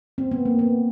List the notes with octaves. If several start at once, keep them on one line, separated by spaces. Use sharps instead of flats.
C4
B3
A#3
B3